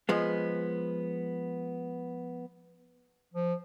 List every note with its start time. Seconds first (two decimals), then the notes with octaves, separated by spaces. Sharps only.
0.09 F3 G#3 B3
3.34 F3